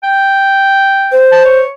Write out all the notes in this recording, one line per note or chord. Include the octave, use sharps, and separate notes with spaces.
G5
C5
A5
C#5